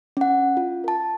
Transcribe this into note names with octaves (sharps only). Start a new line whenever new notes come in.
C#4 F#5
F4
A#4 A5